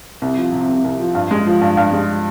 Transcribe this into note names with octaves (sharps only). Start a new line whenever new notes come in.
C2
F3
C3
C2
C2
F3
G2
G#3
F3
G2
G2
G#3